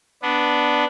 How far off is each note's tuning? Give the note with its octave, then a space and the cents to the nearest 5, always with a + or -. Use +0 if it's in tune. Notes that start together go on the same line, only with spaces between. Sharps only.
B3 +0 D4 +0